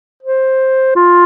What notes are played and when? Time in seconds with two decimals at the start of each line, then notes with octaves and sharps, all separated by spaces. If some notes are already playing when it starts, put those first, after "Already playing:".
0.23 C5
0.96 F4